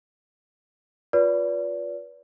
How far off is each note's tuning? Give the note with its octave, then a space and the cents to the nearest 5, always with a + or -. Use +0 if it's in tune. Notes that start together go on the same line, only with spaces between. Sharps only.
F4 +25 B4 -15 D5 -35